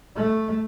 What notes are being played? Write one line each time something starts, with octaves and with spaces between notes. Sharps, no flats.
A3